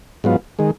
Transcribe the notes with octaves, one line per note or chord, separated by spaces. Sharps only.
G#2 F#3 B3 F4
D#3 G#3